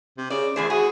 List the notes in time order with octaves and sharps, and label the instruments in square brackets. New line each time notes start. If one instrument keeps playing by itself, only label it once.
[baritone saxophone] C3
[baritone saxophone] C#3 [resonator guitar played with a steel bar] D5
[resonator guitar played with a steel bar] E2 G#4 C5 [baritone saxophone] A3
[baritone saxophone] F#4 [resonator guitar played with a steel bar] G#4